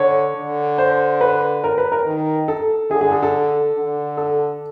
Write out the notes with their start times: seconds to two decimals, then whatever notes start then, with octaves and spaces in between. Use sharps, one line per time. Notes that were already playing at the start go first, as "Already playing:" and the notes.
Already playing: D3 C#5
0.36 D3
0.78 C5
1.21 B4
1.64 A#4
1.78 B4
1.92 A#4
2.06 D#3
2.48 A4
2.91 D3 G#4
3.01 G#4
3.11 A4
3.23 A4
3.76 D3
4.17 A4